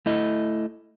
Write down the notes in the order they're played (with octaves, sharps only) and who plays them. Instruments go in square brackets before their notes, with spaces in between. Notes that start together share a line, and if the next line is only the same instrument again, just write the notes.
[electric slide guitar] A3 E4 D#5